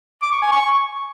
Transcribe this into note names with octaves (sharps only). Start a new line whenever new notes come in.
D6
C#6
G#5
C#6